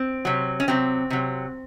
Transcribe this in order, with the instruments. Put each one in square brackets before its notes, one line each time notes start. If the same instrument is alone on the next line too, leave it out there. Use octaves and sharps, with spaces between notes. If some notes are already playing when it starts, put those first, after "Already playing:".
Already playing: [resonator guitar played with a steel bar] C4
C3 F#3
C#4
C3 F#3 C4
C3 F#3